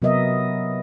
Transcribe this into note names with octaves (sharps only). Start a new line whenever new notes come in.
C3 F#3 B3 A#4 D#5 E5